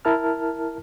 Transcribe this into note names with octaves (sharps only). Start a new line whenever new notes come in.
E4 A#4 A5 F6